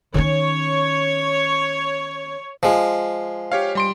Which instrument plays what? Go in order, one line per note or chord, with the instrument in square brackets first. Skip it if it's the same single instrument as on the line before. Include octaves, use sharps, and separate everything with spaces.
[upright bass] D#3 C#4 [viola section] C#5
[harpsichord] F3 G#3
[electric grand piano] G4 C#5 F5
G3 C6 D7